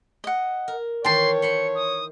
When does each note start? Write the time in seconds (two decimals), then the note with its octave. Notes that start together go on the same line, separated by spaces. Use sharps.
0.24 D#5 F#5
0.68 A#4
1.05 D#3 E3 E4 C#5 G5 A5 C6
1.42 C5 B5 C6 C#7
1.75 D#6